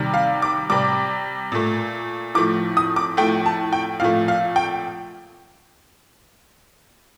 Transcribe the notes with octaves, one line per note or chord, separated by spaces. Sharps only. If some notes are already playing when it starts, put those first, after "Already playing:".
Already playing: C3 D#3 G3
F5
D6
C3 G3 D6
A#2 A3
A2 F3 A3 D6
D#6
D6
A2 F3 A3 G5
A5
G5
A#2 F3 A3 F5
F5
G5